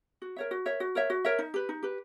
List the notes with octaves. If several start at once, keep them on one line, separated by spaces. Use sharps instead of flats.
F#4
A#4 C#5 E5
F#4
A#4 C#5 E5
F#4
A#4 C#5 E5
F#4
A#4 C#5 E5
D#4
G4 B4
D#4
G4 B4